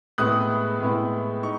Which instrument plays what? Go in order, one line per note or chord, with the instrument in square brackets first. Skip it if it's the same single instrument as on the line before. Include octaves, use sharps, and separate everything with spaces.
[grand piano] A2 G#3 B3 E4 D#6 F#6
A2 G#3 B3 E4
D#4 C#6